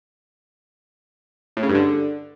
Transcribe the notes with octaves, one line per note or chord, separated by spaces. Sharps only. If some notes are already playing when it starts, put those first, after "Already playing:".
A2
C#3
G2
D3